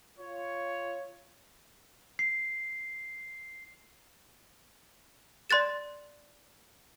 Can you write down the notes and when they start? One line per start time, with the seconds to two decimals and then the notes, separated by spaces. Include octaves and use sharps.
0.18 F4 C#5
2.19 C7
5.50 D5 C6 F#6 A6 E7